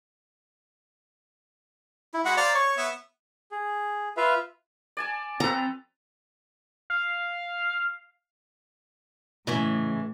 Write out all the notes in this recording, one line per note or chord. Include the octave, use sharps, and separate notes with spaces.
E4
G#3 F#4 F#5 B5
C5 D5 F5 A#5
C#5 C#6
B3 E5
G#4
F4 B4 E5 F5
D5 G#5 A5
F3 C4 A4 B4 A#5
F5
A2 C#3 E3 G#3